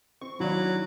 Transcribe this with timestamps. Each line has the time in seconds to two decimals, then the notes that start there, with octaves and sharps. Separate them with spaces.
0.21 C4 C#6
0.40 D#2 F#3 D4 E4